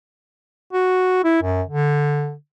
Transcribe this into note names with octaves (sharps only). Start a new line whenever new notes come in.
F#4
E4
F#2
D3